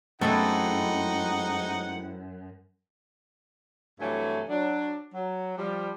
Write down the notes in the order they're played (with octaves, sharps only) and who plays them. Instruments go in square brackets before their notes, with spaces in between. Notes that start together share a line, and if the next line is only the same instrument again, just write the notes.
[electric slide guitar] F#2 [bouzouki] E3 G#3 C4 [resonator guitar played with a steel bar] A3 A4 [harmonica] D#4 F#5
[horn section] G2 C3 E3 F#3 A3 G#5
F#3 D4
F#3
F3 G3